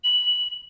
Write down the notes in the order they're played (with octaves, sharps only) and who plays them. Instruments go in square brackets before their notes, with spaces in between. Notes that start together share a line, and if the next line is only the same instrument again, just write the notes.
[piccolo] F#7